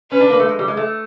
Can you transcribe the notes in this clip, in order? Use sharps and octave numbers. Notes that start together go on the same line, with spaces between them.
C#4 B4
D4
A#3
A3
G#3
G3
G#3
A3